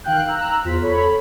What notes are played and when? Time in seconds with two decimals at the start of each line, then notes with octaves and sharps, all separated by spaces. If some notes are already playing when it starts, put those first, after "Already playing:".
0.04 D#3 F5 G5 F#6 G6
0.27 A#5 E6 F#6
0.65 E2 F4 C5 B6
0.82 A4 C#5 B5